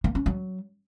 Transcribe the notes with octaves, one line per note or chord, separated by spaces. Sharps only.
A#3
C#4
F#3